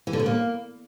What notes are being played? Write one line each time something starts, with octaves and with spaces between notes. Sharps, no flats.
E3
D3
B2
A#3